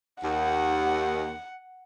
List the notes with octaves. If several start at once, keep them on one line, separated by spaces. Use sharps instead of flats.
D#2 F#5